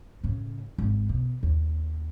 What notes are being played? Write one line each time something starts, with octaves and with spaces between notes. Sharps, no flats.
A2 C#3
G#1
B2
D#2